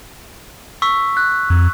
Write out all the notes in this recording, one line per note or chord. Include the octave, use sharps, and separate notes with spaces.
C#6 E6 B6
F#6
F2